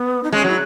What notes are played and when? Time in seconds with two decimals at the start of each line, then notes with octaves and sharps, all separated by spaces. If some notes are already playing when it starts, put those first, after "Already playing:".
Already playing: B3
0.23 D#4
0.32 G#3 C#4
0.44 F#3 E4